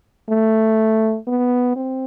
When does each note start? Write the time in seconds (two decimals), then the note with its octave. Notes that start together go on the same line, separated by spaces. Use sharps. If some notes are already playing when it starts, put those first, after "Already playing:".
0.30 A3
1.27 B3
1.76 C4